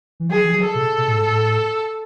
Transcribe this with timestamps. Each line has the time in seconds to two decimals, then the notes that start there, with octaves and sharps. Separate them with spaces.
0.20 E3
0.29 F#3 G#4
0.44 E3
0.52 F#3
0.63 A4
0.75 B2
0.98 B2
1.08 A2
1.16 G#2
1.26 A2